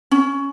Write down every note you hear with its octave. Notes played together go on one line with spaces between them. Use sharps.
C#4